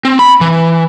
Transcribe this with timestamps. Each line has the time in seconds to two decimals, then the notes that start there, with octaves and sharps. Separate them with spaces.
0.05 C4
0.19 B5
0.41 E3